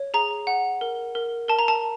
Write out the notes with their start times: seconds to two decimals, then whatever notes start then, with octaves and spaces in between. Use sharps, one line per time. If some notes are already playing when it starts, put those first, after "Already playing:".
Already playing: C#5
0.14 G#4 A#5
0.47 F#5
0.81 A#4
1.15 A#4
1.48 A#4 A5
1.59 A#5
1.68 A5